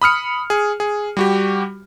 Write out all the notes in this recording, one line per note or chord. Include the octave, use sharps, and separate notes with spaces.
B5 D#6 F6 C#7
G#4
G#4
G3 F#4 G4